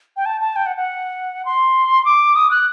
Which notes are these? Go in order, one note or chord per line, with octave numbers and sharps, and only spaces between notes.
G5
A5
A5
G5
F#5
F#5
C6
D6
D#6
F#6